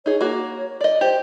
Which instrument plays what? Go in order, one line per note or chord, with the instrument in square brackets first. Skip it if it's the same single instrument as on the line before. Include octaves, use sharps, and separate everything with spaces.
[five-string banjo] D#4 G#4 [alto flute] C#5
[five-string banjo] A#3 F#4
D5 D#5
[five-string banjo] G4 [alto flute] C5